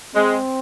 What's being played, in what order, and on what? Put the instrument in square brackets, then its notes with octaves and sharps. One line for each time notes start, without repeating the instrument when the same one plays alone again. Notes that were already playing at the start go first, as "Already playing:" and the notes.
[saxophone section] G#3 [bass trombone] C4